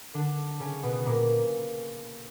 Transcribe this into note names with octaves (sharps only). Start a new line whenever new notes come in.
D3 D4
C#3 C#4
B2 B3
A#2 A#3